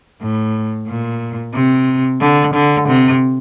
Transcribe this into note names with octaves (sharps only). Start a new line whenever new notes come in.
A2
A#2
C3
D3
D3
C3